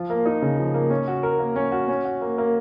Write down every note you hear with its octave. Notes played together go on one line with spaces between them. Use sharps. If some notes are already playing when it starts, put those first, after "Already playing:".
Already playing: F3 F4
A#3
D#4
C#3
F3
A#3
C#4
F#4
A#4
A#3
C#4
F#4
C#4
F#4
A#3
A#3